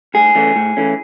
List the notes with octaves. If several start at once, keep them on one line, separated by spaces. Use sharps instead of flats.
A2 G#4
E3 A3 C#4
A2
E3 A3 C#4